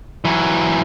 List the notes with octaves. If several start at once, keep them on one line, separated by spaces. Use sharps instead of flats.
E3 F#3